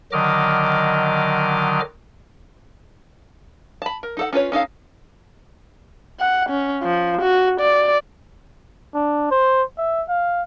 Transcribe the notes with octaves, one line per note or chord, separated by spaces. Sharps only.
D3 D#3 F#3 D#5 D6 F6
A5 B5
A#4
D#4 A4 F#5
C#4 F4 B4 C#5
C#4 D#4 A4 F5
F#5
C#4
F3
F#4
D5
D4
C5
E5
F5